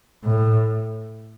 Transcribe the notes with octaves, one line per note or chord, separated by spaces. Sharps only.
A2